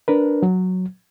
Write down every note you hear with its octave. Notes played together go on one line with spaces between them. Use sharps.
D4 A#4 B4
F#3